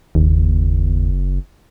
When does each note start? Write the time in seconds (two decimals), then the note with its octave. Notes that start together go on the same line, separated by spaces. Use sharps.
0.15 F#1 D#2